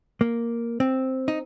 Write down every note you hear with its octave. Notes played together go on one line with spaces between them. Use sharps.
A#3
C4
D#4